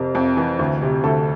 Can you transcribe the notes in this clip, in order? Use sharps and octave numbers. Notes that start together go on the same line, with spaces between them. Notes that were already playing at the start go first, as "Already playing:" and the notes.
Already playing: F2 C3 A#4
F2
E3
D2
C3
D2 A4